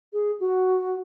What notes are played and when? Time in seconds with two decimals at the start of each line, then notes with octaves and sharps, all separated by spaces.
0.13 G#4
0.40 F#4